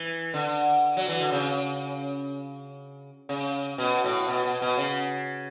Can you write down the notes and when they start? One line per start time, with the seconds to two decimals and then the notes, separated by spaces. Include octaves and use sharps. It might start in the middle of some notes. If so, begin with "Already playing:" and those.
Already playing: E3
0.34 D3
0.97 F#3
1.08 E3
1.20 D3
1.32 C#3
3.29 C#3
3.78 B2
4.04 A2
4.28 B2
4.45 B2
4.62 B2
4.77 C#3